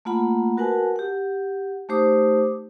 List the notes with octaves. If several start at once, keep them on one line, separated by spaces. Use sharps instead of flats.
A3 A#3 F4 F#5 B5
F#4 A#4 B4 F#5 G#5 A5
G4 F#5
A3 D#4 G4 C5 D6 D#6